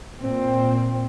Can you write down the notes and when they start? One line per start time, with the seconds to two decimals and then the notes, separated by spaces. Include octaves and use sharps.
0.22 A#2 C4